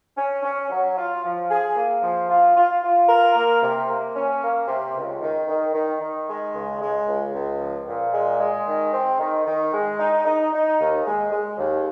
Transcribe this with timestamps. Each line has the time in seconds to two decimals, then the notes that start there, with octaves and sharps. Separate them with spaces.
0.16 C#4
0.43 C#4
0.70 F#3
0.97 F4
1.23 F3
1.50 G#4
1.76 A#3
2.02 F3
2.29 F4
2.56 F4
2.82 F4
3.09 A#4
3.35 A#3
3.62 C3
3.89 A#3
4.15 C#4
4.42 A#3
4.67 C3
4.95 C#2
5.22 D#3
5.48 D#3
5.74 D#3
6.01 D#3
6.28 G#3
6.53 C#2
6.80 G#3
7.07 C#2
7.33 C#2
7.60 F3
7.87 A#2
8.13 G#3
8.40 G#3
8.66 D#3
8.93 C4
9.20 D#3
9.46 D#3
9.72 G#3
9.98 D#4
10.25 D#4
10.52 D#4
10.79 D#2
11.05 G#3
11.32 G#3
11.58 D#2